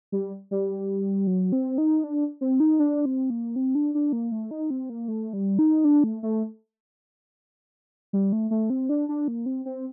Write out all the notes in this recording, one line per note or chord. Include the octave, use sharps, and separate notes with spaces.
G3
G3
F#3
C4
D#4
D4
C4
D#4
D4
C4
A#3
C4
D4
D4
A#3
A3
D#4
C4
A#3
A3
G3
D#4
D4
A3
A3
G3
A3
A3
C4
D4
D4
A#3
C4
C4